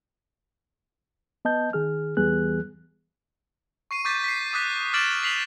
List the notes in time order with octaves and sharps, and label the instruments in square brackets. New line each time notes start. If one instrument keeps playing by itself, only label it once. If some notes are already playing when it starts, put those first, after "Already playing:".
[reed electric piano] B3 D#5 A5 G6
D#3 G#4 F6
E2 E3 G3 B3 G#4 F#6
[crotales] C#6 C7 D#7
C#6 D6 G6 A6 B6
B6 C7
D6 D#6 F#6 B6
D6 F6 A6 D7 E7 F#7
B6 C7 F7 F#7